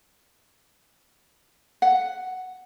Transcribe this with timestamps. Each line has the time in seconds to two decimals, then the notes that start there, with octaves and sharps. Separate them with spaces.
1.82 F#5